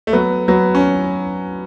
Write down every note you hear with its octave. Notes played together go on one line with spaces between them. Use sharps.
A3
F#3 B3
F#3 B3
C#4